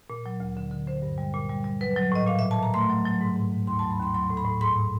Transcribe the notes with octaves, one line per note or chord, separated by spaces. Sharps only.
A#2
F#3
D2
D3
D3
D3 C5
G2
G3
A#2
G3
G3
F#3 B4
F#3
A2 D#5
A#2 F5
E5
A#2
A5
A#2 A#5
A3 C6
F#3
F#3
G#2
G#2
G#2
D#2 C6
A5
F#3
B5
D#2 C6
F#3 C6
A2
B5
A2
G#2 C6